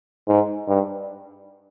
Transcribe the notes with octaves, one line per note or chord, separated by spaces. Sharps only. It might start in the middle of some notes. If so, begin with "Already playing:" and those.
G#2
G2